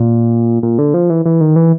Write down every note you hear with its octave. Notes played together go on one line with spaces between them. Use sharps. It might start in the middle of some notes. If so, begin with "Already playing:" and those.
Already playing: A#2
A#2
D3
F3
E3
E3
D#3
E3